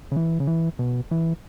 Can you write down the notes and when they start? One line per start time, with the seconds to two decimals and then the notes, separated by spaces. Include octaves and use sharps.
0.12 C#3
0.16 E3
0.40 C#3
0.47 E3
0.79 B2
1.11 E3